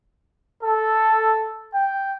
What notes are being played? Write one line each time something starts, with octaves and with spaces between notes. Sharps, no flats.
A4
G5